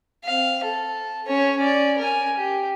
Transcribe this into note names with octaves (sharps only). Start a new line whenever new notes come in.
C4 F5
A4
C#4 C#5
C#4 D5
A#4 G#5
G4